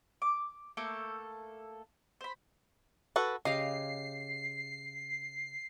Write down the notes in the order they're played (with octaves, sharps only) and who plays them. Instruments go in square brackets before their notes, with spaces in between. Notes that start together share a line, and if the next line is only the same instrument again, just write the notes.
[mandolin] D6
A3 A#3 A4 G6
C5 B5
[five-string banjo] F#4 A4 B4
[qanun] C#3 G4 F5 [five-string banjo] D#5 [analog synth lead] C7